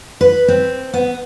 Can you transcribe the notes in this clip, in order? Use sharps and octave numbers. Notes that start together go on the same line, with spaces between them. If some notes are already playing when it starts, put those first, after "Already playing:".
B4
C4
B3